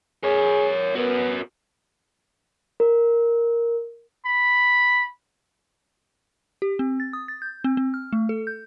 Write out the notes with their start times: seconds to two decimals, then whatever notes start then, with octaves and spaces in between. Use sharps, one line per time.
0.23 G#4 A#4 C#5
0.95 B3 F#4 A#4
2.80 A#4
4.26 B5
6.62 G4
6.79 C4
7.00 A6
7.13 D#6
7.28 A6
7.42 G6
7.64 C4
7.77 C4
7.94 F6
8.13 A3
8.29 A4
8.47 G6